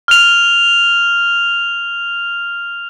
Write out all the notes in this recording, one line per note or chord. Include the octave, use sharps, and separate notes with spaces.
F6 F7